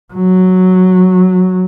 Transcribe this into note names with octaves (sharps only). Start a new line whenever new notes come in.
F#3